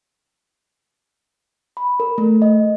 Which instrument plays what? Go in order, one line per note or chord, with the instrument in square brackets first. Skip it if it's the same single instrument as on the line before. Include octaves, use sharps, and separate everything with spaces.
[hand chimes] B5
A#4
A3
D#5